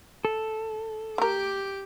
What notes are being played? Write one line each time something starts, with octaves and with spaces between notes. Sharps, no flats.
A4
A3 G4 A#4 D6